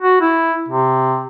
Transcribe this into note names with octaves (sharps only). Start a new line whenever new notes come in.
F#4
E4
C3